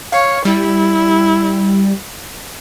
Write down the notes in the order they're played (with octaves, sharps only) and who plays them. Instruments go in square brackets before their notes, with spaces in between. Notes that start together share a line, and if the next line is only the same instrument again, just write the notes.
[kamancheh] C#5 [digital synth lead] F5
[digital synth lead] G3 [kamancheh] E4